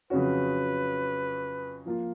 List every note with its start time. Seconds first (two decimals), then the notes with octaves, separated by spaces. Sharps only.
0.10 F2 C#3 F#3 C#4 F#4 B4
1.85 F3 A#3 F4